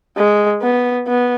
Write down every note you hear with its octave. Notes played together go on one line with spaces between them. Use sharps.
G#3
B3
B3